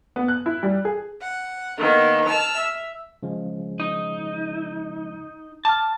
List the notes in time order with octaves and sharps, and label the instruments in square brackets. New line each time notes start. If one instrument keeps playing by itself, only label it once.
[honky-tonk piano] B3
F#6
E4
G3
G#4
[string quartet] F#5
D#3 A#3 B3
A5 E6 F6
E5
[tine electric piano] C#3 F3 G#3
[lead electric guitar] D#4
[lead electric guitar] A5 [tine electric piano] D6 F6